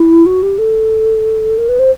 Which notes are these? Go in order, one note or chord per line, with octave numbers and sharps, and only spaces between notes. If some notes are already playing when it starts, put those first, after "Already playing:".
Already playing: E4
F#4
G4
A4
A#4
B4
C5